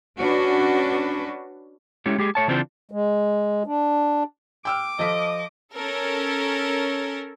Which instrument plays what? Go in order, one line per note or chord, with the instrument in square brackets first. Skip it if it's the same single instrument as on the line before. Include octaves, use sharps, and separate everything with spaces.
[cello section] C#4 D4 F#4 B4
[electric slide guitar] G#3 A3 C#4 E4 G4
G#3 G4 G#4
A3 C#5 A5
C#3 E3 C4 D4 F4 C5
[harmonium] G#3
D4
[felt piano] G5 E6 F6 [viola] D6
[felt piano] F3 A4 B6 [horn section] D#5
[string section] C#4 A4 A#4